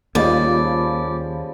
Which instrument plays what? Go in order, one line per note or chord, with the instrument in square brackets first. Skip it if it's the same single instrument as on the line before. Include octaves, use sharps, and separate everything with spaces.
[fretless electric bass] D#2 [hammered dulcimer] C#3 F3 G3 [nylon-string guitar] A#3 F4 D#5 [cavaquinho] D5